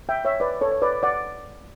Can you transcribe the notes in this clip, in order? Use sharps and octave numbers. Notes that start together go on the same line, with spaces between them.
E5 G5
C#5 E5
B4 D5
A4 C#5
C#5
B4 D5
D5 F#5